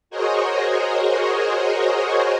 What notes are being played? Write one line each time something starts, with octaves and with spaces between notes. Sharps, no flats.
F#4 G#4 A#4 C5 C#5 D#5